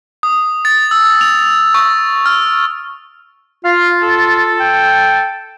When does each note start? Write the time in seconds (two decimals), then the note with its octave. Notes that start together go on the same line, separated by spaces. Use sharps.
0.23 D#6
0.65 A6
0.91 E6
1.21 F7
1.74 C#6
2.26 F6
3.64 F4 F5
4.02 A4
4.60 G5